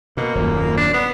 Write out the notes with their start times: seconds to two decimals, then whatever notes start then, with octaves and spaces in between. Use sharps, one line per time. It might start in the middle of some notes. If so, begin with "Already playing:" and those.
0.17 B2 A#3
0.35 D#1 F#2 A#2
0.77 D4
0.94 B3